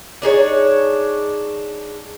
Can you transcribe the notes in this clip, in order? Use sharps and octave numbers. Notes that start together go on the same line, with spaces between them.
D4 D#4 G#4 C#5